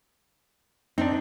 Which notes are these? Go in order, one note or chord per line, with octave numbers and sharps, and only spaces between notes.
C4 D4 D#4